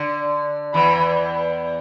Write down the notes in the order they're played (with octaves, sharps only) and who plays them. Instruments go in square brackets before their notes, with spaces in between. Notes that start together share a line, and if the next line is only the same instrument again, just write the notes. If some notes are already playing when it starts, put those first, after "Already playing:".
Already playing: [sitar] D3
[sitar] E2 E3 [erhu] B5